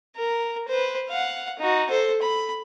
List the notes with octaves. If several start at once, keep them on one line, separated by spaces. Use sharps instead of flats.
A#4
B4 C5
F5 F#5
D#4 F#4
A4 C5
B5